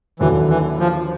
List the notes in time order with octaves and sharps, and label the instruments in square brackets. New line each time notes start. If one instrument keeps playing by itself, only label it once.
[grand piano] D#2 D3 F#3 [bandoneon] E3
[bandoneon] E3
F3